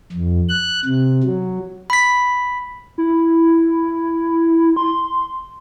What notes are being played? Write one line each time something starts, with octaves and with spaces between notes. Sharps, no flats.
F2
F#6
C3
F#3
B5 B6
E4
C6